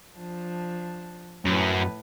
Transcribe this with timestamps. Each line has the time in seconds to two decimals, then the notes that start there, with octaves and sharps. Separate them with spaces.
0.17 F3 D4
1.45 F#2 A2 B4